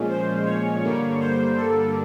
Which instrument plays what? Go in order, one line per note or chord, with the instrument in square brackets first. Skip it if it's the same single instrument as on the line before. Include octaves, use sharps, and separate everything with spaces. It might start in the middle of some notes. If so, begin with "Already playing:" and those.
Already playing: [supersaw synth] A#2 F3 G#3 C#4
C5
C#5
G2 D3 G3 A#3
C5
A4